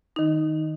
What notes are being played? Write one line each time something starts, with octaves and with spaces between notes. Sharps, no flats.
D#3 D#4